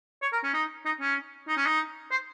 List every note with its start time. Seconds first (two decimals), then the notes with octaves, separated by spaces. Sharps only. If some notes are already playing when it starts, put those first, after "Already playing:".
0.22 C#5
0.33 A#4
0.44 C#4
0.54 D#4
0.85 D#4
1.01 C#4
1.48 D#4
1.57 C#4
1.66 D#4
2.11 C5